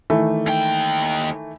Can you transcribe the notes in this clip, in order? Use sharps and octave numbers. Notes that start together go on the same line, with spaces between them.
D#3 E3 A3
D#2 G5